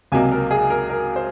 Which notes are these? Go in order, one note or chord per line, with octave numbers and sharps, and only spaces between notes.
C#2 C3 F#3 A#3 G#5
A#4
G#4
A#4
A#4
C5